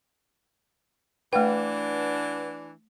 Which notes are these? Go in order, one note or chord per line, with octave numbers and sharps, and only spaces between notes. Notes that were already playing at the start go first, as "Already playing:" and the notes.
E3 A3 D4 B4 F#5 G5